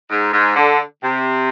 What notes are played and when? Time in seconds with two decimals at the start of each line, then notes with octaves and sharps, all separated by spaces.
0.10 G#2
0.33 G#2
0.56 D3
1.02 C3